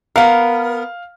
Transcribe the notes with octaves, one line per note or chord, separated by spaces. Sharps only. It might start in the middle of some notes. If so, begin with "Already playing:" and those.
B3 A#4 F5